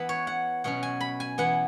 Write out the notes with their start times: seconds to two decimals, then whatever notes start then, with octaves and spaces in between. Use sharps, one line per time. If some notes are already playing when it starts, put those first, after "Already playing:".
Already playing: E3 B3 B4
0.09 C#5
0.27 F#5
0.64 B2 F#3 C#4 F#5
0.83 G#5
1.01 B5
1.20 G#5
1.38 E3 B3 F#5